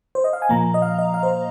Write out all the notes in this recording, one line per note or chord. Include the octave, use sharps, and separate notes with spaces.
C5
D#5
F5
G#5
A#2 F3 A#3 A#5
D#5
F5
D#5
F5
C5